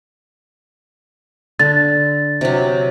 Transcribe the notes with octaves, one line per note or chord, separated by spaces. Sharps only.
D3 A6
C3 F#3